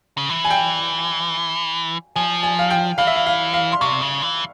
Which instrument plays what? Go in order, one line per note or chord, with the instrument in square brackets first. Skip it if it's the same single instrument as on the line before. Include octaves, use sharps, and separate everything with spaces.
[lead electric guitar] C#3
E3
[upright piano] G#5
G5
[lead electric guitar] F3 [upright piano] G#5
[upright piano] G#5
F5
G5
[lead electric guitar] E3 [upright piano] F5
[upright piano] E5
F5
F5
F5
C6
[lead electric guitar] C3 [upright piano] C#6
[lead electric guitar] C#3
E3